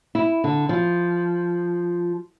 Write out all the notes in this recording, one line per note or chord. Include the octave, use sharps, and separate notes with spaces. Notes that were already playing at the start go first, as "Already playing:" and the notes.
E4
D3
F3